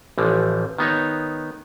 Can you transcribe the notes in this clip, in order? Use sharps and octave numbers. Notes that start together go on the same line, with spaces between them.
A1 E3 F3
D#3 B3 D#4 C#5